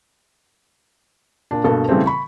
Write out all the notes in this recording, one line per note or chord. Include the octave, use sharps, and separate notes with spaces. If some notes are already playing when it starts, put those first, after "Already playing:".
A#2 D4
G2 B2 A#3 A4
A2 C#3 E3 G3 A3 C4
B5 C#6